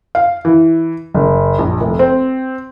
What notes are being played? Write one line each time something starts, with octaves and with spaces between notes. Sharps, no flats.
F5
E3
F#1
A#1
F1
C4